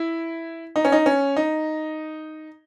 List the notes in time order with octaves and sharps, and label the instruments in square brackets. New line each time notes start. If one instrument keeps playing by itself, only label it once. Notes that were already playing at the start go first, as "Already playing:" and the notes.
Already playing: [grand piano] E4
D#4
C#4
D#4
C#4
D#4